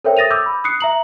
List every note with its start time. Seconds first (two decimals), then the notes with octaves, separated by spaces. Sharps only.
0.05 A4 A#4 C5 C#5 E5 G5
0.17 D#6 A6 A#6 D#7 F7
0.31 D6 E6 G6
0.46 B5
0.64 D#6 F#6 C7 C#7
0.80 E5 A#5 F#7